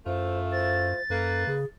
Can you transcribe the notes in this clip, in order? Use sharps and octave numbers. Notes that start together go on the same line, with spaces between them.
F#2 A3 E4 F4 C5
C5 A6
F#2 A#3 A4 B4
C#3 G#4